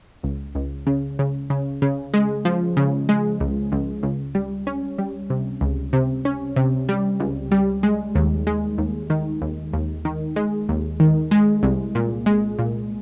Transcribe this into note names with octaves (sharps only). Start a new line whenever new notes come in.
C#2
C#2
C#3
C#3
C#3
C#3
G#3
F3
C#3
G#3
C#2
C#2
C#2
G3
C#4
G3
C3
C#2
C3
C#4
C3
G3
C#2
G3
G#3
D#2
G#3
D#2
D#3
D#2
D#2
D#3
G#3
D#2
D#3
G#3
C2
A#2
G#3
A#2